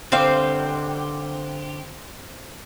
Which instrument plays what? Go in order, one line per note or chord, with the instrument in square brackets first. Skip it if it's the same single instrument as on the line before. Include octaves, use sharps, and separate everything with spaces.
[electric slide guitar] D3 G4 [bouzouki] C4 C5 F5